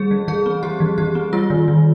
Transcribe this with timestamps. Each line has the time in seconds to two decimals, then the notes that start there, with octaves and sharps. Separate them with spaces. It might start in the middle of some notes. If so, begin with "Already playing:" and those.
Already playing: G3 G#4
0.11 E3
0.28 E3 G#4
0.46 C4
0.63 G3 G4
0.80 E3
0.98 E3 G4
1.15 C4
1.33 G3 F4
1.50 D#3
1.68 D#3